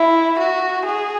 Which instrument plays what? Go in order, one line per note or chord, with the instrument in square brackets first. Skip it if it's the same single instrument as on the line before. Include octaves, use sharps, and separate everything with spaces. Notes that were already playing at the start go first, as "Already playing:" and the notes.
Already playing: [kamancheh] E4
F#4
G#4